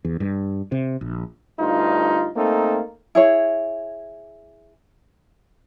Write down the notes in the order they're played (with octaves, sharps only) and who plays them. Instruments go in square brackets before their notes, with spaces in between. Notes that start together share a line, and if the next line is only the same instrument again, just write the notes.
[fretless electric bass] E2
G2
C3
A#1
[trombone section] D2 G2 D#4 F4
A3 A#3 C4 D#4 A4
[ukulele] E4 G#4 C#5